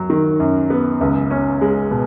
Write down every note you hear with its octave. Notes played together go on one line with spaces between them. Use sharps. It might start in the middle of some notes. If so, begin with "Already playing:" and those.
Already playing: F#2 F#3
D#3
F#2
B3
C#2
C#4
G#3
B2